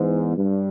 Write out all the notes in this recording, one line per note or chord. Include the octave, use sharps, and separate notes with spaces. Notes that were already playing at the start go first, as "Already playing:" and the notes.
Already playing: E2 G#2
G2